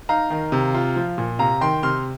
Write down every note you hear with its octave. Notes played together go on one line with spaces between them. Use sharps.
D#4 F5 A#5
D#3
C3
F4
F3
A#2
C3 F5 A#5
D#3 G5 C6
C3 C6 F6